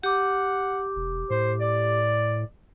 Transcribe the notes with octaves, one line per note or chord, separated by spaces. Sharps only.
G4 F#5 D6
E1
A2 C5
D5